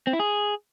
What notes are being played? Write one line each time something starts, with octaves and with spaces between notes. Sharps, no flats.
C4
E4
G#4